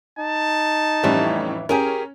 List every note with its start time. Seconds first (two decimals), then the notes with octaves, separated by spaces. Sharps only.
0.19 D#4 A5
1.03 F2 A2 E3 G3 C#4
1.69 C#4 G4 G#4 A#4